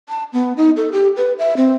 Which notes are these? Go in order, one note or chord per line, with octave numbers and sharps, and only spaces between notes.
A5
B3
D#4
A4
G4
B4
E5
C4